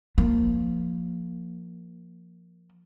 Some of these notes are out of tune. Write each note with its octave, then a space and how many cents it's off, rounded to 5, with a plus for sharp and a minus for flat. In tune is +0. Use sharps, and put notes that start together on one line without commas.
F3 +0 A#3 +0